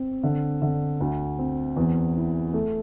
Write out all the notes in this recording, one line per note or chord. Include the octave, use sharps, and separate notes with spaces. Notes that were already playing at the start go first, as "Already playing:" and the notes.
Already playing: C4
D3
D3
D2
C4
E2
E4
A3